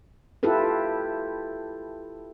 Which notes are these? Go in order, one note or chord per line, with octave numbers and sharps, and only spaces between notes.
E4 F4 G4 A4 B4